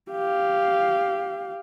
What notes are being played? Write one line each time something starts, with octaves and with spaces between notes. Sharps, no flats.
G4 F5